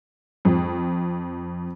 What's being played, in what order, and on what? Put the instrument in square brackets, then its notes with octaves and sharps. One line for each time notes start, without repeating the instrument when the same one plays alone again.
[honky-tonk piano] F2